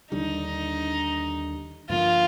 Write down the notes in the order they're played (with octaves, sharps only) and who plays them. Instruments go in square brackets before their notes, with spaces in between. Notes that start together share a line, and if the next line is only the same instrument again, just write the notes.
[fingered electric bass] D#2 D3 G3 D4 [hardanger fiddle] D#4
[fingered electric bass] G2 D3 F3 A#3 [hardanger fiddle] F4